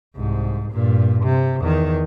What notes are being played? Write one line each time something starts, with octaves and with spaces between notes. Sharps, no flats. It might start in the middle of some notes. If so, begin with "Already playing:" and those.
C2 G#2
G2 A#2
C3
E2 D#3